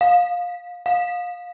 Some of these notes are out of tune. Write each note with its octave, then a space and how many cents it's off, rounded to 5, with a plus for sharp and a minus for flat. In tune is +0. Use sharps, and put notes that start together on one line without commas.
F5 +20
F5 +25